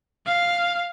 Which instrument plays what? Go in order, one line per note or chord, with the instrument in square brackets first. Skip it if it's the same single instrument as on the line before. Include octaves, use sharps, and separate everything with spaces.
[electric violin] F5